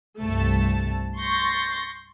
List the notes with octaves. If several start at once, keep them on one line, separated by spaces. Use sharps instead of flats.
C2 G2 A3 A5
C6 C#6 G6 A6 A#6 C7